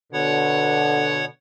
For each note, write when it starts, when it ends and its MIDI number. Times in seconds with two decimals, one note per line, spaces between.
0.13 1.25 47
0.13 1.25 50
0.13 1.25 73
0.13 1.25 78